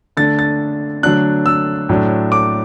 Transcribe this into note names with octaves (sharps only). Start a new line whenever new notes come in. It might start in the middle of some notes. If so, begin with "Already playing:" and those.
D3 A3 D4 A6
A6
D3 F#3 A3 D4 F#6
E6
A2 F#3 D4
D6